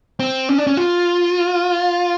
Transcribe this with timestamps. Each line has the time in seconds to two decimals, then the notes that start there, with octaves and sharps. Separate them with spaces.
0.20 C4
0.49 C#4
0.58 D4
0.67 C#4
0.77 F4